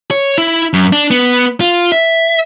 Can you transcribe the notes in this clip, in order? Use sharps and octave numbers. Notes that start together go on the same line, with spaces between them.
C#5
E4
F#2
D4
B3
F4
E5